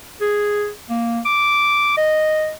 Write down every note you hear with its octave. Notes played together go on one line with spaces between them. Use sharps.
G#4
A#3
D6
D#5